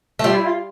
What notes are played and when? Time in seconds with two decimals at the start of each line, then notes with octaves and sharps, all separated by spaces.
0.19 A3
0.24 G3 F4
0.35 E4
0.46 F4